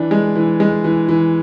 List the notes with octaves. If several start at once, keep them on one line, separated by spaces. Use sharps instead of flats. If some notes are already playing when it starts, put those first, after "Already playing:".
Already playing: E3 D4
G#3
E3
G#3
E3
E3